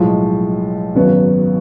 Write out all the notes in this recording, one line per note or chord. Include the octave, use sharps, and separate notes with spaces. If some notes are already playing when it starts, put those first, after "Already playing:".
Already playing: B1 A2 F3 G#3
G#1 F#2 C#3 F#3 B3